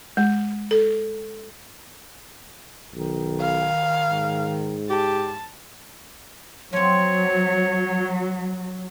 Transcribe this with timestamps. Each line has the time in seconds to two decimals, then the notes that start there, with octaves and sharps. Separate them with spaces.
0.17 G#3
0.71 A4
2.95 B1 D#3
3.40 F5
4.10 G#2
4.90 G4 A5
6.73 F3 F#3 C4 C#5